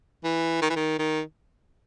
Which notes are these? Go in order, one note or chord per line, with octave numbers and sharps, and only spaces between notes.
E3
D#3
E3
D#3
D#3